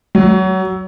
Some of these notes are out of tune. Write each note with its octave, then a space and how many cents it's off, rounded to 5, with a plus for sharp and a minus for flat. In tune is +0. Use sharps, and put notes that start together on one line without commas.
F#3 +25